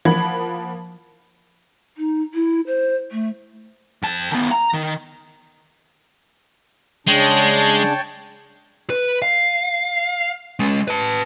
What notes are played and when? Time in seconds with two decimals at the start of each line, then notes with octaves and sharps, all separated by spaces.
0.05 F3 A#3 F#5 B5 G#6
1.97 D#4
2.34 E4
2.67 C5
3.12 A3
4.03 F2 A5
4.31 D#3 B3
4.51 A#5
4.74 D#3
7.07 C#3 G#3 D4 C#5 G5 A5
8.90 B4
9.22 F5
10.59 G#3 C#4
10.88 B4 A5